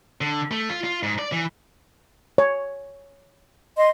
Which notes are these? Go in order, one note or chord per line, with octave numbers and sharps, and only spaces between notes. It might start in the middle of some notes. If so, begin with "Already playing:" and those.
D3
A3
F4
F4
G#2
D5
E3
C#5
D#5 C6